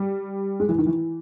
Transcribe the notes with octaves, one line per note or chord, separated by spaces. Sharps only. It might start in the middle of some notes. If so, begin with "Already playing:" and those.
Already playing: G3
G#3
E3
D#3
E3